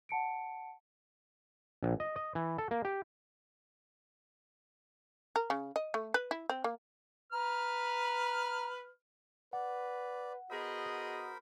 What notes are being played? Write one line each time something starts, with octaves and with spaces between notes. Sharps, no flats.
F#5 A5 C#7 D7
A#1
D#5
D#5
E3
A4
A#3
G4
A#4
C#3
D#5
A3
B4
E4
C4
A#3
B4 A#5 F6
B4 D5 F#5
B3 F#4 G#4 A#4 C5 D#5 B5